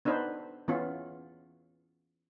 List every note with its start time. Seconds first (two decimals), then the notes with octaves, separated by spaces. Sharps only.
0.05 B3 D4 D#4 B4 C5
0.68 E3 B3 C#4 F4